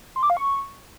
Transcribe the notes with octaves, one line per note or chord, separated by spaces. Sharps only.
C6
D6
F5
C#6